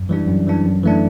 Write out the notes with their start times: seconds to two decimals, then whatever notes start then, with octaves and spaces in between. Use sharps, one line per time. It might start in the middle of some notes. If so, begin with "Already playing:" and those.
Already playing: F#2
0.09 E3 G3 D4
0.27 F#2
0.47 E3 G3 D4
0.65 F#2
0.83 E3 A3 D4